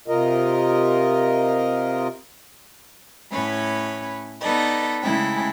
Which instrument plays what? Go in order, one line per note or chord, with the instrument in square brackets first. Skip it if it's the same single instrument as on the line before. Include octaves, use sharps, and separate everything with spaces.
[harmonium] C3 F4 A#4 D#5
[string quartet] A2 C#4 B4 C#5 B5
B3 D#4 A4 B4 D5 D#5
C#3 G#3 A3 E4 G5 F#6